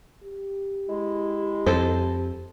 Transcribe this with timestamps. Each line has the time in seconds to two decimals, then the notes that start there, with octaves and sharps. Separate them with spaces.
0.23 G4
0.89 G#3 E4
1.66 F2 A4 C5